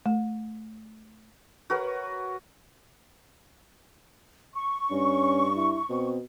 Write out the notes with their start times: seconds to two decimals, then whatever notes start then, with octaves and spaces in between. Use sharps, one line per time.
0.06 A3
1.70 F#4 A#4 B4 C#5
4.53 C#6
4.91 G2 C#4
5.56 E4
5.90 B2 C4